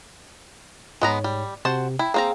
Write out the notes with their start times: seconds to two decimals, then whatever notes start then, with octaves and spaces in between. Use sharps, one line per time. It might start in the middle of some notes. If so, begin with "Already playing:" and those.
1.01 G#2 G#3 B3 C#5 A#5
1.24 G3
1.65 C3 F#4 C5 A5
1.99 E4 G5
2.14 A#3 C4 G#4 F5 G5 A#5